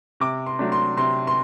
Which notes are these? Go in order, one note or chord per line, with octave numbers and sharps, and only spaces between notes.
C3 D6
C6
F#3 A3 D4
C6
C3 C6
C6